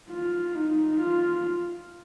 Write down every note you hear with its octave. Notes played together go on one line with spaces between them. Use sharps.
F4
D#4
F4